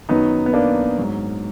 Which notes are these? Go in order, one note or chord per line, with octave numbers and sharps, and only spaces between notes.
F#2 D#3 F#3 B3 D#4
B3
A#3 D4
G#2 F#3